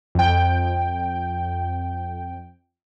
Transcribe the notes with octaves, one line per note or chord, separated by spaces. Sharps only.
F2 G5